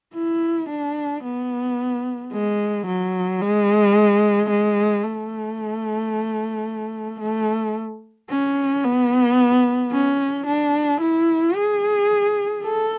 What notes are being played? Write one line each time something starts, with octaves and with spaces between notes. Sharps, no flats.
E4
D4
B3
G#3
F#3
G#3
G#3
A3
A3
C#4
B3
C#4
D4
E4
G#4
A4